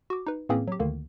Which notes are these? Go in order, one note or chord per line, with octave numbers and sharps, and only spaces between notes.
F#4 D6
D#4 B4
A2 E3 A#3 C4 C#4 G#4
F#3 G4
D2 D3 D#3 A#3